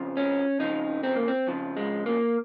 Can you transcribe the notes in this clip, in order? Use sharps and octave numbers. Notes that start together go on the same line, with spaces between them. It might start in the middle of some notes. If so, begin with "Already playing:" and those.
Already playing: F2 C#3 F3
C#4
F2 C#3 F3 D#4
C4
A#3
C4
F2 C#3 F3
G#3
A#3